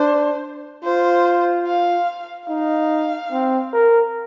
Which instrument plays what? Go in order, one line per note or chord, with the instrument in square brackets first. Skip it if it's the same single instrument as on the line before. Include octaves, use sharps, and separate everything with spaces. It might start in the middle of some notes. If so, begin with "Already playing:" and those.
Already playing: [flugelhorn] D4 [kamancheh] C5
[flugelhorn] F4 [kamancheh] C5
[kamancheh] F5
[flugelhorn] D#4 [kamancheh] F5
[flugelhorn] C4
A#4